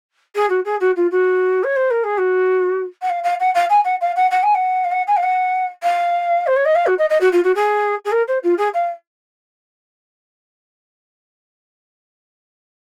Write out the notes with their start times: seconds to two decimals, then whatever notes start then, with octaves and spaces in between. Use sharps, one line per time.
0.35 G#4
0.49 F#4
0.65 G#4
0.80 F#4
0.96 F4
1.11 F#4
1.63 C#5
1.76 C5
1.90 A#4
2.03 G#4
2.17 F#4
3.02 F#5
3.09 F5
3.23 F5
3.40 F#5
3.54 F5
3.69 G#5
3.84 F#5
4.01 F5
4.16 F#5
4.31 F#5
4.43 G#5
4.54 F#5
4.84 F5
4.91 F#5
5.07 G#5
5.16 F5
5.23 F#5
5.83 F5
6.46 C5
6.56 C#5
6.65 D#5
6.75 F5
6.86 F#4
6.98 D#5
7.09 D#5
7.20 F#4
7.32 F4
7.44 F#4
7.55 G#4
8.05 G#4
8.11 A#4
8.27 C5
8.43 F4
8.57 G#4
8.74 F5